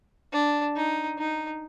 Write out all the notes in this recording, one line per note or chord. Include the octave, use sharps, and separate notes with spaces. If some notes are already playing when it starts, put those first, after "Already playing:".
D4
D#4
D#4